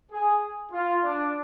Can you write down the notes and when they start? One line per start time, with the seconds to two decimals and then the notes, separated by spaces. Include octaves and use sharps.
0.12 G#4
0.72 F4
1.03 D4